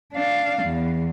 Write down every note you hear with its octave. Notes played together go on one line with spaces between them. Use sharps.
D4 F5
E2